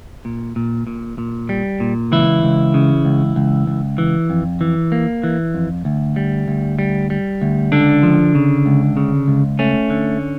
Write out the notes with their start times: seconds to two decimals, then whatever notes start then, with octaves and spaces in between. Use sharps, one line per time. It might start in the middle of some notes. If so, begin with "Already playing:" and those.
0.25 A#2
0.56 A#2
0.87 A#2
1.18 A#2
1.49 G3
1.80 A#2
2.12 C#2 E3 E4
2.43 C#2
2.74 C#3
3.05 C#2
3.36 C#2
3.67 C#2
3.98 E3
4.30 F2
4.61 E3
4.92 A#3
5.24 E3
5.54 F2
5.85 D2
6.16 G3
6.48 D2
6.79 G3
7.10 G3
7.42 D2
7.72 C#2 D3 D4
8.03 F3
8.35 C#3
8.66 C#2
8.97 C#3
9.28 C#2
9.59 A3 C#4
9.90 D3